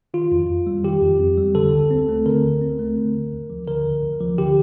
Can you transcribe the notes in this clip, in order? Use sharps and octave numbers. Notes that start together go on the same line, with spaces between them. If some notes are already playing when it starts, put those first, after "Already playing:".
D#3 F4
F2
F2
G3
D#3 G4
F2
F2
G3
D3 A4
D2
C4
A3
D3 A#4
D2
C4
A3
D3
D2
D2
F3
D3 A#4
D2
D2
F3
D3 G4